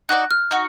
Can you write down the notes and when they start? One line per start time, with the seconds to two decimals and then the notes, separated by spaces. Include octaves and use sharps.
0.09 D#4 F#4 B4 D5 F#6
0.31 F6
0.51 D#4 F#4